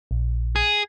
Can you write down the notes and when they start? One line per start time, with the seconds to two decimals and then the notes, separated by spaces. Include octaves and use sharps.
0.11 A#1
0.56 G#4